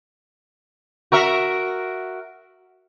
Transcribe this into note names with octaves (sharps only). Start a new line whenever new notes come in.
F#4 A#4 E5